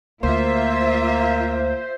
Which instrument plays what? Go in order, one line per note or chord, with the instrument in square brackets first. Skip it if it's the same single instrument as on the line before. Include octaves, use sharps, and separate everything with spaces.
[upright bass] D2 [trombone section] A#3 [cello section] F4 E5 [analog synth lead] C5